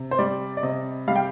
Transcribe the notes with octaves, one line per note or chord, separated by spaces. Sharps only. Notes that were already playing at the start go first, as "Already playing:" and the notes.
Already playing: C3
C5
G3 D5
D5
C3 D#5
G3 F5
G5